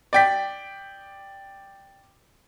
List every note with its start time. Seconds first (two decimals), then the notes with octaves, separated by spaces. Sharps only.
0.13 D5 G5 B6